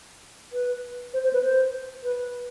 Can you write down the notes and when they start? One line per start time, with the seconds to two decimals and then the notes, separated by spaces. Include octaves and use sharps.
0.53 B4
1.14 C5
1.24 C5
1.33 B4
1.43 C5
2.04 B4